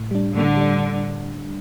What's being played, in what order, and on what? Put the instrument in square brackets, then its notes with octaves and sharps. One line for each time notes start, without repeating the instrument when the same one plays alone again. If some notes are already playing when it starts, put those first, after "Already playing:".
Already playing: [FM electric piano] A2
G3 D4
[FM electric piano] A2 [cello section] D3
[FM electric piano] G3 D4